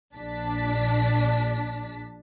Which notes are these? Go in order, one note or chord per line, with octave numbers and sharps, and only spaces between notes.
A#1 D4 A5 B6